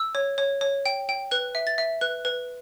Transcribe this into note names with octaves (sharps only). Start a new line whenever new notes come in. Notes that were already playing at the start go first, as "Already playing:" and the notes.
Already playing: E6
C#5
C#5
C#5
G5
G5
B4 F#6
E5
A6
E5
B4 F#6
B4